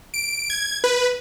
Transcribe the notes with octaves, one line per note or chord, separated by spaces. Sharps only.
D7
G#6
B4